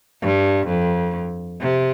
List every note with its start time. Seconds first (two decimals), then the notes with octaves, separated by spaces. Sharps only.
0.22 G2
0.68 F2
1.60 C3